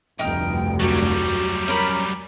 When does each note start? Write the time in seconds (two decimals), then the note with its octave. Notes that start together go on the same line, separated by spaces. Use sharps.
0.19 F1 D2 G2 D#4 G5 F6
0.80 F#3 G3 F#4 A5
1.68 C#4 A#4 B5